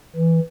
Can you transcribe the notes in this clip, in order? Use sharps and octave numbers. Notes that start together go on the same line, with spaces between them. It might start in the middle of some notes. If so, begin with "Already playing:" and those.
E3